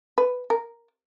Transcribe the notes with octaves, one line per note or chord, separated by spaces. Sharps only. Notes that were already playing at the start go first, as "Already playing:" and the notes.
B4
A#4